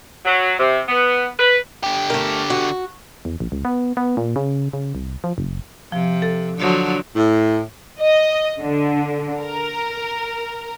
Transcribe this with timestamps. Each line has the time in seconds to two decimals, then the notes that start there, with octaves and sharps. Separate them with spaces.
0.25 F#3
0.59 C3
0.88 B3
1.39 B4
1.83 D3 G4
2.10 A3 A#4
2.50 F#4
3.25 E2
3.40 A#1
3.52 C#2
3.65 B3
3.97 B3
4.17 A#2
4.36 C#3
4.73 C#3
4.95 C2
5.24 F3
5.38 F#1
5.92 C3 F3
6.22 A4
6.58 D3 F3 F#3
7.16 A2
8.00 D#5
8.59 D3
9.41 A#4